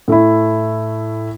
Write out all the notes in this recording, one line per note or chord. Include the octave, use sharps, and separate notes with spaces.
A2 A3 E4